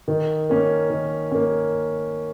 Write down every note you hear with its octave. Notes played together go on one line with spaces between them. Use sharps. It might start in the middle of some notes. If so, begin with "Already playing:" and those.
D#3
A#3 C#4
D#3
A#3 C#4